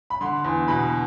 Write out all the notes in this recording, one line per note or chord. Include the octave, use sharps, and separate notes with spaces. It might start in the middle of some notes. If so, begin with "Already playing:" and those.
B5
D3 C6
E2
B2 B5